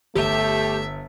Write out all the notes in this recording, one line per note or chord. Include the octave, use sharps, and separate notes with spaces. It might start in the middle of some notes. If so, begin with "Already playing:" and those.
G1 A3 G4 E5